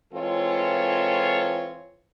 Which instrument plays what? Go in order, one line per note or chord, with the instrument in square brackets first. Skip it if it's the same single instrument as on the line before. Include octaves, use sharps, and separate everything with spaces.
[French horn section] E3 G#3 C4 F4 A4 C#5